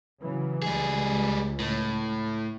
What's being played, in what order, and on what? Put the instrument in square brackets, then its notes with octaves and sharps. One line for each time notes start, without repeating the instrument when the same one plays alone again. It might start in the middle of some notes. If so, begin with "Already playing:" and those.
[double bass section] C#3 E3 F#3
[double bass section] C#2 [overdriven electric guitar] G3 G#4
[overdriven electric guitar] A2